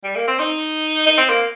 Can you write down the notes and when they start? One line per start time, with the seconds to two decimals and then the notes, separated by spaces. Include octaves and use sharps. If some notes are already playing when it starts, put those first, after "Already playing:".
0.04 G3
0.16 A#3
0.28 C4
0.39 D#4
1.07 D#4
1.18 C4
1.30 A#3